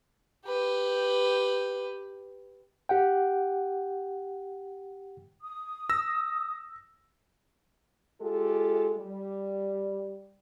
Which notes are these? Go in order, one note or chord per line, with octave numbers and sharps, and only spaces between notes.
G4 B4
G4 F#5 G5
D#6
E6 A#6
G#3 F4 G4 A4
G3